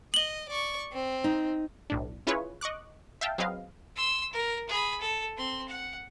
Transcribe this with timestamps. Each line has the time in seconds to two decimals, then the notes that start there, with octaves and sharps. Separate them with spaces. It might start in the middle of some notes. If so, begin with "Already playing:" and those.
0.14 D#5 F#7 G7
0.49 D5 C#6
0.93 C4
1.24 D#4
1.90 B1 A2 D4
2.27 C#4 E4 F4 G#4 B4 C#5
2.61 D#5 C#6 D6 F#6
3.21 E5 F5 G5 A5
3.38 F#3 C4 G#4 B4 D#5 F5
3.96 C6 E6
4.32 A#4
4.69 G#4 B5
5.00 A4
5.37 C4 C6
5.68 F#5